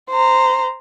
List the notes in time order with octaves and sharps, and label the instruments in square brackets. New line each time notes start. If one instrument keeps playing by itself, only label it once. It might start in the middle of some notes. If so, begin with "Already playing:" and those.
[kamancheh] C5 A#5